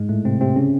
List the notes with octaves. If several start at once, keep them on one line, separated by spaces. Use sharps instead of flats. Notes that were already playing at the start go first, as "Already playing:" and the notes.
Already playing: G#2 G#3
A2 A3
C3 C4
C3 C4
C#3 C#4